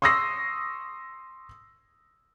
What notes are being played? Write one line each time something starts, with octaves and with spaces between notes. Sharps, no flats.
C6 C#6 D#6 E6 A#6 C7